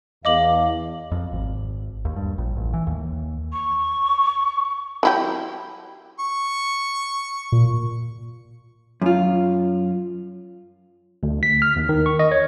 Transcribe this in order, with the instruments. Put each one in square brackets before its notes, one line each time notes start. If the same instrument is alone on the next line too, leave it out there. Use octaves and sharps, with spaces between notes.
[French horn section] E2 [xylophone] D#5 D6 F#7 [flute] F5
[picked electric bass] F2
G#1
D#2
G2
A#1
A1
E3
D#2
[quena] C#6
[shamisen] F#3 E4 G4
[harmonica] C#6
[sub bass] A#2
[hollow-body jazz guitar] F#2 F4
[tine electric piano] D2
B6
F6
D#2
D#3
C#6
D#5
C#5